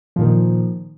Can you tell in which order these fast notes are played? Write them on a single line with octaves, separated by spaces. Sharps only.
F3 A#2 D#3